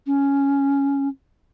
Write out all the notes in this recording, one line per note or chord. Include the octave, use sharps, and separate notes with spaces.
C#4